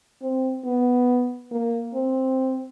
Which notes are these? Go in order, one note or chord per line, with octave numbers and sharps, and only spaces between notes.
C4
B3
A#3
C4